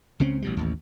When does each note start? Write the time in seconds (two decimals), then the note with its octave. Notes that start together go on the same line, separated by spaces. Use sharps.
0.20 C#2 C#3 C4 C#4
0.42 A1 B2 G3
0.57 A1 D#2